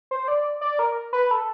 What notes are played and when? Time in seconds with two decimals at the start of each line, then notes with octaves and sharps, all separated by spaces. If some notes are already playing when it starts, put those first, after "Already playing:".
0.11 C5
0.28 D5
0.61 D5
0.79 A#4
1.13 B4
1.31 A4